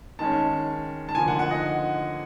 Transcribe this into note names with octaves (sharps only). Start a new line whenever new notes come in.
D#3 G#3 C#4 A5
A5
D3 F3 A#3 G#5
F#5
F#5
D#5